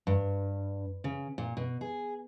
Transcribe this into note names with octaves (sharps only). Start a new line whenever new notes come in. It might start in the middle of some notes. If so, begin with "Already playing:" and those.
G2
C#3
A#2
B2
G#4